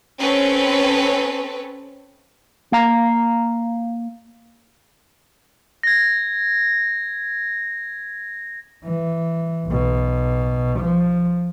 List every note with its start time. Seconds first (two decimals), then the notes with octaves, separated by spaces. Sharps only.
0.20 C4 C#4 A4 B4 C#5
2.72 A#3 F5 A#5
5.83 G#6 A#6
8.85 E3
9.67 B1 B2
10.80 F3